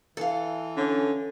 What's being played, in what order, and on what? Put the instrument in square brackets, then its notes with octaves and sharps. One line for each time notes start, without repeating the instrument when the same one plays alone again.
[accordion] E3 [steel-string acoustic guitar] A4 F5
[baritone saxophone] D3 [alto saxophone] C#4